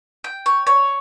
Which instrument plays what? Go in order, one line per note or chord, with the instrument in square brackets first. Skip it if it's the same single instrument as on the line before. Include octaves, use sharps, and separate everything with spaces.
[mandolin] G5
C#5
C#5